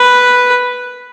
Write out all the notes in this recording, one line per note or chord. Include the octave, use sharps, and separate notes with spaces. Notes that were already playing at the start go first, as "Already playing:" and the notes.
Already playing: B4